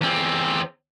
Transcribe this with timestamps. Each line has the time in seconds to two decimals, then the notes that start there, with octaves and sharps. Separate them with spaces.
0.01 E2 C4